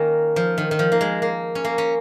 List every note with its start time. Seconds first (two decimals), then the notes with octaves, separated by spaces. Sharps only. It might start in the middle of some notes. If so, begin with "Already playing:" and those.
Already playing: D#3 A#3 C#4
0.36 F3
0.58 D#3
0.71 D#3
0.79 F3
0.92 A#3
1.01 G#3
1.22 A#3
1.55 C#4
1.65 A#3
1.78 C#4